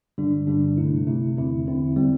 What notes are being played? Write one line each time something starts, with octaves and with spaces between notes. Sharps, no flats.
G2 D3 G3 D4
G2 D3 G3 D4
C3 A3 E4
C3 A3 E4
E2 D3 C4 E4
E2 D3 C4 E4
G3 C4